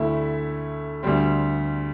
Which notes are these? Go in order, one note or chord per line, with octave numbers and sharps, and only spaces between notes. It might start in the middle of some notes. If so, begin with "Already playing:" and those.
Already playing: D2 D3 A3 E4
D2 D3 G3 C4